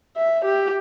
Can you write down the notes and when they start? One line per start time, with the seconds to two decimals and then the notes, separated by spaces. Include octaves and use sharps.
0.17 E5
0.45 G4